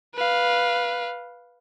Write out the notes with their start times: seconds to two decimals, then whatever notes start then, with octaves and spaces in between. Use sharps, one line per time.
0.15 B4 F5